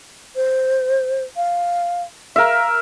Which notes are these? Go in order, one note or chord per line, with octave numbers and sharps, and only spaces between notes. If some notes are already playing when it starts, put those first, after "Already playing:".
C5
F5
A#4 E5 F5